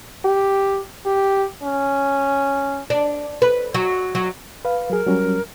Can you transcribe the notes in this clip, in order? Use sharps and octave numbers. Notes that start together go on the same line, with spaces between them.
G4
G4
C#4
D4
B4
F#3
F#3
B4 F5
F#3 G#4 A#4
F#3 G3 C#4